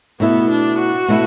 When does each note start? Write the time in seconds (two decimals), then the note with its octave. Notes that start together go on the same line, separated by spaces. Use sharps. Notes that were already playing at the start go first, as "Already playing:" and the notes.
0.20 B2 A3 B3 E4
0.50 D4
0.79 F#4
1.08 B2 A3 E4